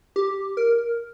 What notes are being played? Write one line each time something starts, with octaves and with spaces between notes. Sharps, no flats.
G4
A#4